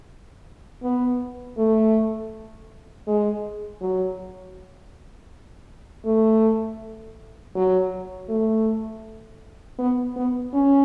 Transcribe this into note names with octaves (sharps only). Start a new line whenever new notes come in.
B3
A3
G#3
F#3
A3
F#3
A3
B3
B3
C#4